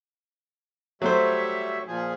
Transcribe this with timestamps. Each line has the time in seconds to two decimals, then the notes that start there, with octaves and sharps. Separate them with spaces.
1.02 F#3 G3 A3 C5 C#5 E5
1.87 A#2 F3 G#4